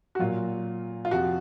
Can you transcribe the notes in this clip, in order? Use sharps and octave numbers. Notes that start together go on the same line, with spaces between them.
F#4
A#2 F#3 F4
F4
F2 C3 F3 F#4